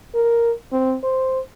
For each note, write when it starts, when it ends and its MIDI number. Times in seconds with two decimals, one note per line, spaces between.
0.15 0.52 70
0.72 0.95 60
1.03 1.40 72